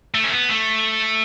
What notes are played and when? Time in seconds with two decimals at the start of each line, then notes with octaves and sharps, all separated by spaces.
0.14 A3
0.24 C#4
0.31 B3
0.49 A3